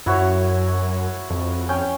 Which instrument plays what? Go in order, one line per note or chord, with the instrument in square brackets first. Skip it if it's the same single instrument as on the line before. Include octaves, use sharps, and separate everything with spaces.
[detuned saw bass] F#2 [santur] E4 F#4 C#5
[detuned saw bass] F2
[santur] C#4 G5